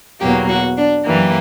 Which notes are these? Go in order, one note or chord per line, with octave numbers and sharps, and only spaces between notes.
E2 B2 F#3 A#3 G4
F#4
D4
F#2 E3 A#3 G4